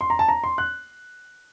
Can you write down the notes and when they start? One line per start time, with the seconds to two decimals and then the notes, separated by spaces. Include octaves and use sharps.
0.01 C6
0.10 A#5
0.19 A5
0.29 A#5
0.44 C6
0.58 F#6